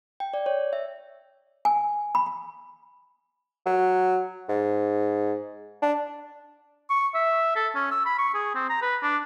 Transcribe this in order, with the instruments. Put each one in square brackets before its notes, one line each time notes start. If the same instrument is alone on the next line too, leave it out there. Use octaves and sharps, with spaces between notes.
[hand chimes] G5
D5
C#5
E5
[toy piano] G#5
B5
B5
[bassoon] F#3
G#2
D4
[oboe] C#6
E5
A4
C#4
E6
B5
C#6
G#4
C4
A#5
B4
D4